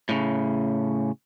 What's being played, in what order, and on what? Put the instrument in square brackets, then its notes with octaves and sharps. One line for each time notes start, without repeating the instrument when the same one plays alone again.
[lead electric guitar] A2 C#3